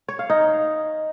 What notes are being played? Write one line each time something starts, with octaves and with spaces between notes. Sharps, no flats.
C#5
F5
D#4